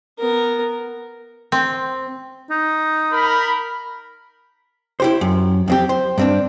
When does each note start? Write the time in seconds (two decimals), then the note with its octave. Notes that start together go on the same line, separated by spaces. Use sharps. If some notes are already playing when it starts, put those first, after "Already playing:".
0.18 B3 A#4
1.52 C4
2.50 D#4
3.12 A#4 B5
5.00 E4 G4 C5
5.21 F#2
5.68 F2 C4 G4
5.89 C5
6.18 G2 C4 D4